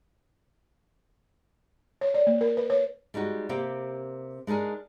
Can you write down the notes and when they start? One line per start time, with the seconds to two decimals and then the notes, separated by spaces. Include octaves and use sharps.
2.01 C#5
2.14 D5
2.27 A#3
2.41 A#4
2.57 B4
2.70 C#5
3.14 G3 G#3 D#4 F#4
3.49 C3 A#3 C4 G4
4.47 G#3 D4 D#4 G#4 A#4